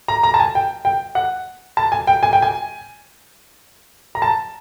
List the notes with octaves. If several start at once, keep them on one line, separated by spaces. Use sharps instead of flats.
A#5
A#5
A5
G#5
G5
G5
F#5
A5
G#5
G5
G#5
G5
G#5
A#5
A5